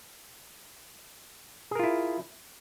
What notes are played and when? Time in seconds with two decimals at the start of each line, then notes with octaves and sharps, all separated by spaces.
1.71 G#4
1.75 A#4
1.79 F4
1.83 E4